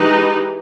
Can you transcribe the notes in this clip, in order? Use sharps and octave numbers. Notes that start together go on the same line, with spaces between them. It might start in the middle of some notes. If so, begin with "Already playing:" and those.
Already playing: E3 G#3 D#4 G4 B4